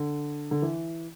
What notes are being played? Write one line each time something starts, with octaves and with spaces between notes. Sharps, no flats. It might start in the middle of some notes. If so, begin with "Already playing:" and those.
Already playing: D3
D3
E3